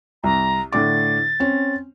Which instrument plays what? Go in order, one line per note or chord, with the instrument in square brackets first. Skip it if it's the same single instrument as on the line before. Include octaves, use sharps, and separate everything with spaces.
[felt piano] C2 [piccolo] A#5
[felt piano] A2 D3 D6 [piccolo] A6
[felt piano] C4 C#4